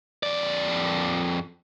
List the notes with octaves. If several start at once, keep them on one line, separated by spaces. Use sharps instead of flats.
F2 D5